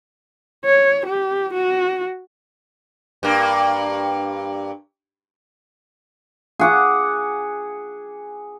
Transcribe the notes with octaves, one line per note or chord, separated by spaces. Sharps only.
C#5
G4
F#4
G2 A#3
G#4 F#5 D6